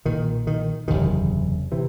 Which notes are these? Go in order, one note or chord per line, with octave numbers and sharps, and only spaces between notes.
B1 A#2 D#3
D#3
F#1 E2 C3 D#3
C3 E3